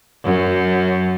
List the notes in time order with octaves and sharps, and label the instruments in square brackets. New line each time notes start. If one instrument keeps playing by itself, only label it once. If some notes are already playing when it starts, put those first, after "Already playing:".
[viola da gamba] F#2